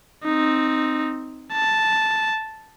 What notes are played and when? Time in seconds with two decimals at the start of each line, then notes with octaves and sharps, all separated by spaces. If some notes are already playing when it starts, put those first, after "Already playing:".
0.24 C4 D#4
1.52 A5